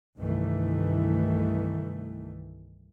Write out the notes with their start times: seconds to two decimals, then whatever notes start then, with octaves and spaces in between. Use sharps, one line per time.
0.18 C2 G2 D#3 E3 A3